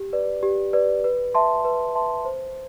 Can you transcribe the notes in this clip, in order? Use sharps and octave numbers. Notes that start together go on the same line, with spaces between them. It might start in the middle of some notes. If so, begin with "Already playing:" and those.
Already playing: G4
B4 D5
G4
B4 D5
B4
E5 A5 C6
B4
E5 A5 C6
C5